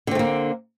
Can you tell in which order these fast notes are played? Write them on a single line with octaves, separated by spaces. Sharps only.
D3 C4 A3 A#3